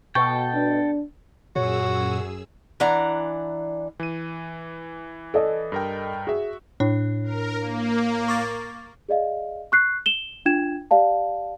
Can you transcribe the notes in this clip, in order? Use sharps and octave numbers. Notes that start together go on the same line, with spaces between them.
B2 A4 G5 C#6
D4
F#2 A#2 F#4 G#4 C#5 E6
E3 D4 F#5 A#5
E3 D#7
A4 D5 D#5
G2 A#4 G5
F#4 G#4 E5
A2 D4
A#4
A#3
C#6 D6 A6
G#4 D5 D#5 F5
C#6 F#6 C7
E7 G7
D4 F4 G5 G#6 E7
G4 D5 F5 A5